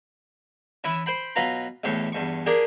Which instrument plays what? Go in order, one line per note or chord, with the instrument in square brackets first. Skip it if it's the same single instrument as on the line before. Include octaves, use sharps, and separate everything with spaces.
[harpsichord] E3 C#4 E4
C5 G5 B5
B2 F#3 F4 B4 A#5
B1 E2 A2 G4 C#6
E2 G2 C#6
A#3 D4 G4 G#4